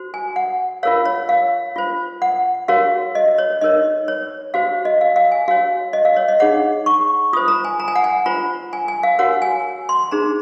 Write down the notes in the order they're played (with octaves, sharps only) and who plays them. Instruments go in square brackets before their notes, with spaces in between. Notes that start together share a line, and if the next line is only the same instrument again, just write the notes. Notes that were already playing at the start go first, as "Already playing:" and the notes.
Already playing: [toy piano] F#4 C5
G#5
F#5
F4 A#4 C#5 F5
C#5
F5
F4 C5
F#5
F#4 A#4 C#5 F5
D#5
C#5
D#4 A#4 C#5 D#5
C#5
F#4 C5 F5
D#5
F5
F5
G#5
F#4 C#5 F5
D#5
F5
C#5
D#5
D#4 G#4 C#5 F#5
C#6
F4 C5 D#6
A#5
G#5
A#5
G#5
F#5
G#5
F4 C5 A#5
G#5
G#5
F5
F#4 A#4 C#5 F#5
G#5
C6
D#4 G#4 C5 A#5